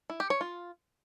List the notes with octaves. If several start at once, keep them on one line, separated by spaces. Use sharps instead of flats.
E4
G4
C#5
F4